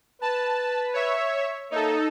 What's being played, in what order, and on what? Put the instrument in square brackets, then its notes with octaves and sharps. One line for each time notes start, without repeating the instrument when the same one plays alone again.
[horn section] B4 [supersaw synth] A5
[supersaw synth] C#5 E5
[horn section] A#3 C#5 E5 [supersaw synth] D#4 A4